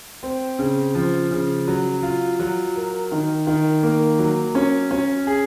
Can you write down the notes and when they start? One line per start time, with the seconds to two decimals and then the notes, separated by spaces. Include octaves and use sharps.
0.23 C4
0.59 C#3
0.95 F3
1.31 C#3
1.68 F#3
2.03 F4
2.40 F#3
2.75 A#4
3.12 D#3
3.47 D#3
3.83 A#3
4.19 F#3
4.55 C#4
4.91 C#4
5.27 G#4